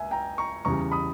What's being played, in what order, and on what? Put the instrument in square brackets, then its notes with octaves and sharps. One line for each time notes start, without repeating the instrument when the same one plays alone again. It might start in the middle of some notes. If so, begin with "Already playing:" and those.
Already playing: [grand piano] C#2 E5 G#5
G5 A#5
A#5 C#6
E2 C#3 E3 G3 A#5 C#6
B5 D#6